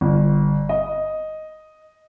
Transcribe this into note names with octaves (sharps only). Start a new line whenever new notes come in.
G1
D#5